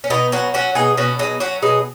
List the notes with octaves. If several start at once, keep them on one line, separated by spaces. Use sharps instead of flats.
C#4
B2 B3 D#4
F#3 C#4 F#4
F#3 C#4 F#4
B2 D#4 G#4
B2 C#4 F#4
F#3 D#4 G#4
F#3 C#4 F#4
B2 D#4 G#4